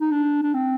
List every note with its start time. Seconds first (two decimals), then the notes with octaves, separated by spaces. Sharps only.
0.01 D#4
0.11 D4
0.42 D4
0.54 C4